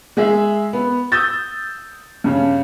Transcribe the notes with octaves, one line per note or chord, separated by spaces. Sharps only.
G#3 G#4 E5
B3
D#6 E6 G6 A6
G2 C#3